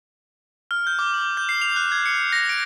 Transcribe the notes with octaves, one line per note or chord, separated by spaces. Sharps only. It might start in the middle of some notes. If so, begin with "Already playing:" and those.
F6
G6
D6
F#7
G6
C7
F7
F#6
G#6
C#7
A#6
D7